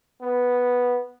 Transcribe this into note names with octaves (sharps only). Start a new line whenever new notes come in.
B3